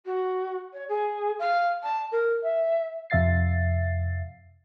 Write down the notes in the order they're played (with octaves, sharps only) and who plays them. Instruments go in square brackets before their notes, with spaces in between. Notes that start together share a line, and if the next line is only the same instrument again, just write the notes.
[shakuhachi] F#4
C#5
G#4
F5
A5
A#4
E5
[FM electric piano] F2 C3 E5 F5 A6 C7